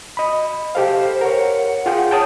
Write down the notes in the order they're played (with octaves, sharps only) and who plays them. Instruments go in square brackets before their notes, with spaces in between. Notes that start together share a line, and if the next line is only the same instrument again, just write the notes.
[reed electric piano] D#5 B5
[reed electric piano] G4 A4 F5 [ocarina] C5
[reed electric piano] A#4 C#5 [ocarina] F#5
[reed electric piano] F4 G#4 G5
[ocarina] C#5 [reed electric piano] G5 A5 D#6